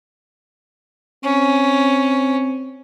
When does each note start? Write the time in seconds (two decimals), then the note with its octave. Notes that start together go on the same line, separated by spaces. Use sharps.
1.24 C4 C#4